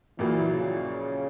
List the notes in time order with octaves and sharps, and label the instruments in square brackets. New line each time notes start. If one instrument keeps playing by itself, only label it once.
[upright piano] A#1 A#2 F#3 A#3 [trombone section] E3
[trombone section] C#3